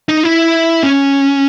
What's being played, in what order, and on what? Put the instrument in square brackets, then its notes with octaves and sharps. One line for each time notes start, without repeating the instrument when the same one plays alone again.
[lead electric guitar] D#4
E4
C#4